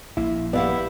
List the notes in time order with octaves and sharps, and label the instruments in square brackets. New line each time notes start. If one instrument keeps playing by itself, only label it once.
[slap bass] A#1 A#3 [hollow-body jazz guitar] E4
[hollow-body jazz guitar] B3 [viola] E4 G4 [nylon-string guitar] D5 F5 F#5